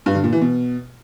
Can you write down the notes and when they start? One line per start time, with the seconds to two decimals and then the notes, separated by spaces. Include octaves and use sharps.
0.06 G2
0.15 D3
0.24 A#2
0.33 E3
0.41 B2